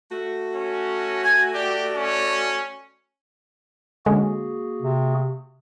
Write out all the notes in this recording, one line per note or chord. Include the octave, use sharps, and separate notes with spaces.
A3 F#4
C#4
G#5 G#6
G4 D5
C#4
D3 G#3 A#3 C#4 F#4 G#4
C3